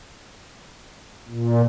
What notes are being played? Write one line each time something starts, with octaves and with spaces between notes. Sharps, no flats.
A#2